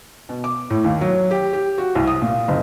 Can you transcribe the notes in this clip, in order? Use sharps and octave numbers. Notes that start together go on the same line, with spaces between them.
B2
D6
A2
D#2
F#3
G4
G4
F#4
C2
D#6
A#2
F#1